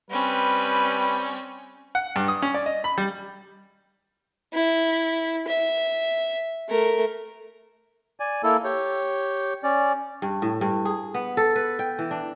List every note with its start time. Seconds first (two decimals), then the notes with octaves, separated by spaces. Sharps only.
0.10 G3 C4 C#4 B4
1.95 F#5
2.16 G2
2.28 D#6
2.42 C#4
2.54 D5
2.66 D#5
2.84 B5
2.98 G3
4.54 E4
5.48 E5
6.69 A3 A#4
8.20 D5 G#5
8.43 A#3 E4 A4
8.64 G4 C#5
9.63 C#4 D5
10.22 G2
10.42 A2
10.61 G2
10.85 G#4
11.14 B3
11.37 A4
11.56 B4
11.79 G5
11.99 E3
12.11 D4